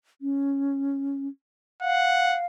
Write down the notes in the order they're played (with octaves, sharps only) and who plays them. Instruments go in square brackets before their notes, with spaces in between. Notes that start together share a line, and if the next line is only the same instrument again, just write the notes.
[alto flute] C#4
[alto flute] F5 [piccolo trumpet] F#5